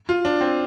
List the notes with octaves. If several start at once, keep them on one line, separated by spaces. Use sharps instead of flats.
F4
D4
C4